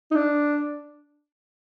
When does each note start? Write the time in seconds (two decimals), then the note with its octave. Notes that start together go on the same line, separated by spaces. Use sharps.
0.11 D#4
0.15 D4